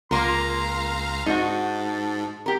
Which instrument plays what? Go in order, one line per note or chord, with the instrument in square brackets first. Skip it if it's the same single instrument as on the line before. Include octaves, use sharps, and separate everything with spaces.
[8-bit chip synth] C#2 F5 A#5 [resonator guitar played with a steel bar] A#3 F4 A#4 [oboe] C6
[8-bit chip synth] G#2 [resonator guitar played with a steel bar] D#4 F#4 [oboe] A5
[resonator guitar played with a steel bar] G4 A#4